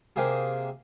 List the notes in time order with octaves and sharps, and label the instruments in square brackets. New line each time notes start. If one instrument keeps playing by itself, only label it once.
[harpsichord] C3 A#3 G4 G#4